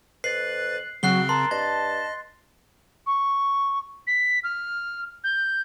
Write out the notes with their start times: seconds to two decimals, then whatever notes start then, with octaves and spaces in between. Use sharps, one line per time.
0.24 F2 B4 F#6 A6 C7
1.03 C#3 F#3 C4 F#4 F#6 C7 G7
1.29 A#4 A5 C6
1.51 G2 D#5 A6
3.06 C#6
4.07 B6
4.43 F6
5.23 G6